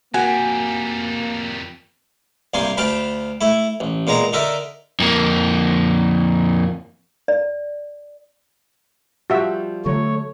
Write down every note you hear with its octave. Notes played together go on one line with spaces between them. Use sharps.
F2 G3 A#3 F#4 G#5
C2 G2 A#3 G#5 C6
D2 F5 G5 A5 B5
A3 E4
A1
A#2 G#3 B3 A#5
D3 D#4 A4 A#4 E5
F2 A#3
D5
F3 G3 F4 F#4 E5
D3 F#3 A3 C#5